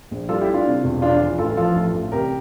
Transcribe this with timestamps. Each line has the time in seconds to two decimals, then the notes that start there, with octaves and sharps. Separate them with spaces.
0.11 A#1
0.29 G3 F4 A4
0.41 E4 G4
0.48 G3
0.54 D4 F4
0.66 C3
0.84 E1
1.02 E3 D4 F4
1.21 E3
1.38 A1 F4 A4
1.57 F3 F4 A4
1.76 A1
1.94 A1
2.12 C2 G4 A#4